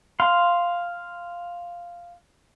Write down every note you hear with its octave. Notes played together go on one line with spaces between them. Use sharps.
F5 C6